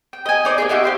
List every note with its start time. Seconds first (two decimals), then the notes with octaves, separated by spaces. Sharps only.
0.13 G5
0.26 D#5 G#5
0.45 D#4 C5 D5
0.58 A#3 D#4 G#4
0.69 D#4 E4 F#4 G4
0.84 G4 C5 F5